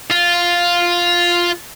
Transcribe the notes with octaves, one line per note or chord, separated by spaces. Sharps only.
F4